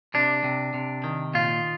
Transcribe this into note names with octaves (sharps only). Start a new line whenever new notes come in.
C3 D4
C3
C3
D#3
A#2 F4